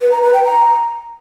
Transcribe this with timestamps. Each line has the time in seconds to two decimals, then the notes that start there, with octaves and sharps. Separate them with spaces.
0.01 B4
0.12 A#5
0.22 B4
0.33 G5
0.44 A#5